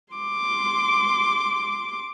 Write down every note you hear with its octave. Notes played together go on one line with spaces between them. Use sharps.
C6 D6